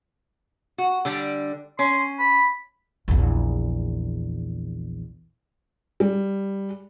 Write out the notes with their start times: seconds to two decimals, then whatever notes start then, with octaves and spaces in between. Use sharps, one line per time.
0.78 F#4
1.05 D3 G3 D4
1.79 C#4 C6
2.19 B5
3.08 A#1 E2
6.00 G3